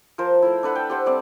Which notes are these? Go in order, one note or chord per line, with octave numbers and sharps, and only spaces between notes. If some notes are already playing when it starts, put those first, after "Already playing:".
F3 A#4 C5 A5
A3 E4
D4 A4 B4 F#5
G5
G4 C5 F#5
G3 C4 D5 E5